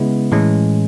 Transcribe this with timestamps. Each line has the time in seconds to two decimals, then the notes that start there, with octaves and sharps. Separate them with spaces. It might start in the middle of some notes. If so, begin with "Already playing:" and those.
Already playing: C#3 G#3 B3 E4
0.32 A2 E3 G#3 C#4